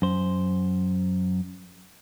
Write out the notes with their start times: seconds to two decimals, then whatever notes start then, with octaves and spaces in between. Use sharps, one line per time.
0.02 F#2 C5